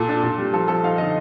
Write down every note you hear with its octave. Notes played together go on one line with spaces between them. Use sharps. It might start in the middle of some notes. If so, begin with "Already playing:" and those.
Already playing: A#2 A4
D4
A#2
G3
F3 A4
F3 A4
D#4 F5
D3 D#5